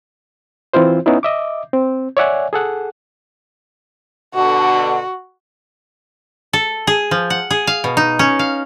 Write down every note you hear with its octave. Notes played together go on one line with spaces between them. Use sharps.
E3 C4 E4 F4 C5
B3 C#4 D#4 E4
D#5 E5 D6
C4
C#5 D5 E5 F#5 G#5
G#4 A4 F#5
B2 D3 F#4
A4
G#4
F3
F#5
G#4
F5
B2
D#4
C#4
F5